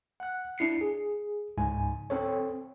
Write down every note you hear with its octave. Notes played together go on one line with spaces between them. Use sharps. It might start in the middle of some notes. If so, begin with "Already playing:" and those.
F#5 F#6
D4 E4 C7 C#7
G#4
C#2 G#2 G#5
C4 A4 C#5